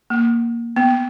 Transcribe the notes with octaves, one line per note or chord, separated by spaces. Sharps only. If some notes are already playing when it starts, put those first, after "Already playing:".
A#3
B3